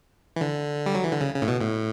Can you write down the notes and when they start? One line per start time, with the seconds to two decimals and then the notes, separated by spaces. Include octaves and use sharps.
0.36 E3
0.41 D3
0.86 G3
0.95 F#3
1.04 E3
1.13 D3
1.21 C#3
1.35 C#3
1.42 A2
1.48 B2
1.61 A2